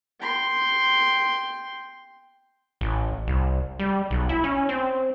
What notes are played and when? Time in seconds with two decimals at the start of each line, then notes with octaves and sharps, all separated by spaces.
0.21 G5 C6
2.81 A1
3.27 C2
3.79 G3
4.11 B1
4.29 E4
4.44 C#4
4.69 C4